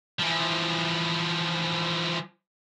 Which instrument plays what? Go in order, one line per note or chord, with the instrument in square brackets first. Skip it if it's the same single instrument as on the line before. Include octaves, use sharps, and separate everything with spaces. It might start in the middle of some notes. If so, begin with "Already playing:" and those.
[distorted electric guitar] E3 F3